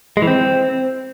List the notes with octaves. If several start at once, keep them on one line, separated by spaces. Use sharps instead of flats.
G#3
E3
C4